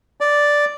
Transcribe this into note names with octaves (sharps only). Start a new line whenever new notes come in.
D5